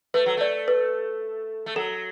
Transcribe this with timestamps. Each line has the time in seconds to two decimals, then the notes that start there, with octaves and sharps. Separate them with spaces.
0.14 A3 B4
0.26 F#3
0.37 A3 D5
0.68 B4
1.66 A3
1.76 F#3 A4